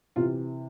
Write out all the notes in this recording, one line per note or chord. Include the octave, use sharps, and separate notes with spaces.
C3 E3 F4